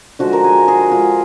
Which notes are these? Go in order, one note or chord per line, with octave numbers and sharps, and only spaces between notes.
D3 F3 G#3 F#4
A#4
G#4
G#4
D3 G#3 F4